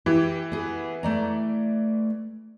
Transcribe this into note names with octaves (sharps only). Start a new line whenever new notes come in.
E3 G4
B3 G#4
A3 D5 A#5